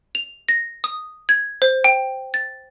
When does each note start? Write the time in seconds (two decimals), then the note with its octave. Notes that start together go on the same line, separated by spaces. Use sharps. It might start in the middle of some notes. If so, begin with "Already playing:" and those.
0.15 F7
0.49 A#6
0.84 D#6
1.29 G#6
1.62 C5
1.84 G5
2.34 A6